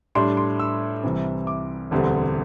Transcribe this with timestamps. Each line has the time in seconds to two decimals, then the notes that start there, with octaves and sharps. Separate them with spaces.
0.15 A2 G3 D4 C6
0.37 C6
0.60 E6
1.03 C2 C3 E3 G3 C4
1.47 D6
1.91 E1 D2 D3 G3 C4